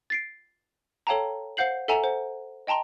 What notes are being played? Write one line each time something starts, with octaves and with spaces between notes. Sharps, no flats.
A6 C7 D7
A4 C#5 F5 G5 A5 A#5
C5 F5 F#5 G6 C7 F#7
A4 E5 F#5 G#5 A#5 E7
C5 F#5
D#5 G5 A5 A#5 C6